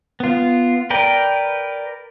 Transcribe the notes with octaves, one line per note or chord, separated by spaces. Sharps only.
B3 F4
A#4 B4 D5 G5